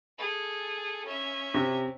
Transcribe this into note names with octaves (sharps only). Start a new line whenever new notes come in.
G#4 A4
C#4 E5
C3